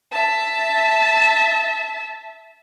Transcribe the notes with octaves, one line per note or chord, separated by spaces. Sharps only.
E5 A5